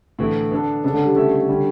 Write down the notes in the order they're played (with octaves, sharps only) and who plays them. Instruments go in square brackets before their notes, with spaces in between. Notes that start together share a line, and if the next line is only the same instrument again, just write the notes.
[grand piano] A2 E3 A3 E4 [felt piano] D3
[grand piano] B3 D4 A4
[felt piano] C#3 [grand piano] B3 D4 A4
[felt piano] D3
G3
[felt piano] D3 [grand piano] A3 C#4 E4 A4 E5
[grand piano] D3 G3 C#4